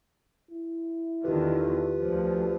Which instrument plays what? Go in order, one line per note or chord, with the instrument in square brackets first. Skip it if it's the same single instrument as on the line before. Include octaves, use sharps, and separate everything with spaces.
[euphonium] E4
[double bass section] E2 D3 D#3 [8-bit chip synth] F4 G4 B4
[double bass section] D2 F3